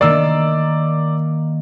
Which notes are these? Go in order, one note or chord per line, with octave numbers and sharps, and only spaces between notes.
D#3 A#3 D5 D6 E6